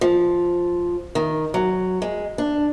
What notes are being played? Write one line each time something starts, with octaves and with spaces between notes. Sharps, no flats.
F3
D#3
F#3
G#3
D4